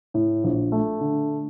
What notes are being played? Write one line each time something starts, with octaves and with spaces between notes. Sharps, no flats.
A2
A#1
A3
D3